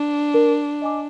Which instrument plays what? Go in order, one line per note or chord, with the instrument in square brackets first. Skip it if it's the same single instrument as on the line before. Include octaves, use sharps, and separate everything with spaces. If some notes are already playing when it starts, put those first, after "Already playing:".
Already playing: [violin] D4
[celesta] A#4
D#5 G#5 D6